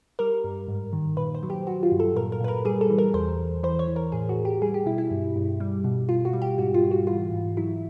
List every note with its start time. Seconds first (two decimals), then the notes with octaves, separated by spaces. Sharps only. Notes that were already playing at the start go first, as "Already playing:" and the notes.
0.19 G3 A#4
0.44 G2
0.68 G#2
0.93 D#3
1.17 A#2 B4
1.35 C5
1.43 F#3
1.50 G4
1.67 F#3 F#4
1.83 F4
1.92 G2
2.00 A4
2.15 A#2 A#4
2.32 A#4
2.40 A#2 B4
2.48 A#4
2.65 G3 G#4
2.81 A4
2.90 E3
2.98 A#4
3.14 E2 C5
3.39 E2
3.63 E3 C5
3.79 C#5
3.87 E3
3.96 A#4
4.12 A2 G#4
4.29 F#4
4.38 A2
4.45 G4
4.62 G3 G#4
4.74 G4
4.86 B2 E4
4.98 E4
5.11 G2
5.36 G2
5.60 G3
5.84 B2
6.09 B2 F4
6.25 F#4
6.33 G3
6.42 G4
6.58 G#2 F#4
6.74 F4
6.83 G#2
6.91 F#4
7.07 E3 F4
7.32 G#2
7.57 F#3 E4